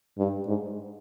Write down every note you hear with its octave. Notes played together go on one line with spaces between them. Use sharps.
G2
G#2